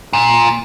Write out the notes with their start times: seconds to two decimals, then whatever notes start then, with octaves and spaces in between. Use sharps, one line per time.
0.13 A#2